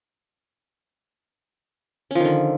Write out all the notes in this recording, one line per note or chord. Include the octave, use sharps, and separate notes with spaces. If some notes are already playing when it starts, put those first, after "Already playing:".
D3 D#3 F3 C#4